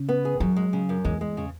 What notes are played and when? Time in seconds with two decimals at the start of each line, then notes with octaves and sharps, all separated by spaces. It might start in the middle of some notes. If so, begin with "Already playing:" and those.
Already playing: C#3
0.09 B3
0.25 G#4
0.40 F#2 F#3
0.56 G#3
0.73 C#3
0.89 F#2
1.05 E2 G#3
1.21 G#3
1.37 C#3